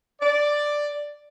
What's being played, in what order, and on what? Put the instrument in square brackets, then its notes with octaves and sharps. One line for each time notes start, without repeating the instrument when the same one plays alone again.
[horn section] D5